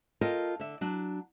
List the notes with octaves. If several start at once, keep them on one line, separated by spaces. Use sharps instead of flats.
F4 A4 A#4 D#5 G5
D3 E5
F#3 D4